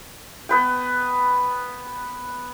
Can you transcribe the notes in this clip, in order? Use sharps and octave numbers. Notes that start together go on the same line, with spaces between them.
B3 B4 G5